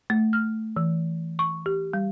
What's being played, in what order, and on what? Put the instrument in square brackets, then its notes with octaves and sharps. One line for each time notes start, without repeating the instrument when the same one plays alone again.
[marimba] A3
F6
E3
C#6
G4
G3